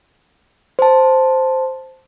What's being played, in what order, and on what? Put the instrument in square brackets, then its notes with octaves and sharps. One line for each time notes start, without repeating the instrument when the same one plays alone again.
[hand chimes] C5 A5